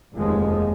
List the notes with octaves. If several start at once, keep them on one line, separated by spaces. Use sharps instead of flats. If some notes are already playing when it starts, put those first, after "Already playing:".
F1 D#2 F3 G#3